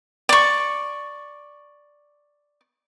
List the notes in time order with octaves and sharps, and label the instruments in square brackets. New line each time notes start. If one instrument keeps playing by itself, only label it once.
[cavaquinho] D5 C#6